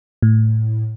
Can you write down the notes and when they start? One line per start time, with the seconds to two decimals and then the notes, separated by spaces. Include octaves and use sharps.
0.22 A2